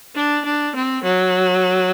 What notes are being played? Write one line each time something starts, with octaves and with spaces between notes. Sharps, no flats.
D4
D4
C4
F#3